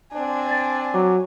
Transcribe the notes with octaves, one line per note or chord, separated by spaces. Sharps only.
C4 D4 G#5
D5 A6
F#3 D6